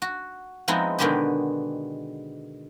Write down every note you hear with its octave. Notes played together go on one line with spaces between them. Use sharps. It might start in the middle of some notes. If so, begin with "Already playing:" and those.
F#4
F3 G#3 B3 C4 D#4 E4
B2 D3 D#3 G#3 B3 G4